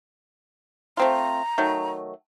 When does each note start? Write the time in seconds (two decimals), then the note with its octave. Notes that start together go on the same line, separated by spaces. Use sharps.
0.97 A3 C4 F4 A#5
1.58 D#3 F#3 A3